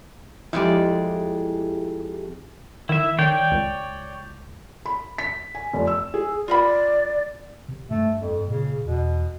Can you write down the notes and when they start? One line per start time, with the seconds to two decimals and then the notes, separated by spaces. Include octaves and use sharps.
0.53 F2 G#3 E4 G4 D5
2.89 D#3 E4 E5
3.19 D#3 C#5 D5 G5
3.51 C#2
4.86 B5
5.18 B6
5.55 G#5
5.73 F1
5.87 E6
6.14 G#4
6.48 F4 A#4 D5 B5
7.68 C3
7.91 G2 A3
8.19 F2
8.48 A#2 C#3
8.85 E2 B2